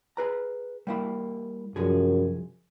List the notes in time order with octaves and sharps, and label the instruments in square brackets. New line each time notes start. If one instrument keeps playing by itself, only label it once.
[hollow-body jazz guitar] G#4 B4 A#5
G3 A#3 E4
[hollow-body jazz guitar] C2 F3 G#4 [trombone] F#2